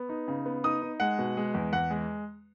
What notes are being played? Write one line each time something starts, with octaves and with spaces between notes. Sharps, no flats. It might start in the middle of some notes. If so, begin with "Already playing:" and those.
Already playing: B3
D#4
C#3
B3
D#4 D#6
D#4
G#3 F#5
B2
G#3
E2
E2 F#5
G#3